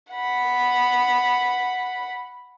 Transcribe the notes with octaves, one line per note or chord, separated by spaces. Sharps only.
F#5 B5